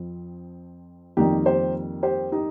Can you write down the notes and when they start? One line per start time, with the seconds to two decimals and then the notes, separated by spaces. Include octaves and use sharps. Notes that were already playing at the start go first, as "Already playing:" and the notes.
Already playing: F2 F3 C4
1.17 F2 D#3 G3 A#3 D#4 G4
1.46 G4 C5
2.03 G4 C5
2.32 D#4 G4